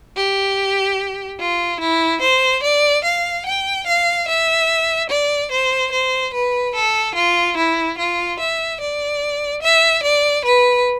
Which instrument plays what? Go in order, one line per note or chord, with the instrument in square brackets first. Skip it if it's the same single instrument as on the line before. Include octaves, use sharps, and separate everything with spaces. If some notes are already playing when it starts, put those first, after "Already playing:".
[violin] G4
F4
E4
C5
D5
F5
G5
F5
E5
D5
C5
C5
B4
A4
F4
E4
F4
E5
D5
E5
D5
B4